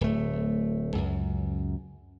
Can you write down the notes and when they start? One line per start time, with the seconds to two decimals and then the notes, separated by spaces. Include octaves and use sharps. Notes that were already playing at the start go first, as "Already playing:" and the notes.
0.01 D1 A3
0.95 C#2 F#2